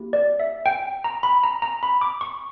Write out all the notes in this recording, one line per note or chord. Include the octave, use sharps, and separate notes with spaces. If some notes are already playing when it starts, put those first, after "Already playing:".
Already playing: A#3 E4 G4
D5
E5
G5
A#5
B5
A#5
A#5
B5
D6
C#6